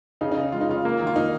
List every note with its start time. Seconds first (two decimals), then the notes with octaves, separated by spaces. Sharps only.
0.21 C#3 D#4
0.31 D#4
0.37 C#3
0.52 G#3 F4
0.61 D#4
0.69 C#3 F4
0.85 A#3
1.01 D#3
1.07 F4
1.16 D#3 D#4